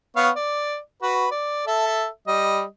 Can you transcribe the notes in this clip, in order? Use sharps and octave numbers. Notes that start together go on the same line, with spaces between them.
B3 C#5 F5
D5
F#4 B4
D5
A4 E5
G3 D#5